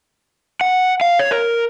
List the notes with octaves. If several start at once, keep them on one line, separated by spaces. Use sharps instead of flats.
F#5
F5
C#5
A#4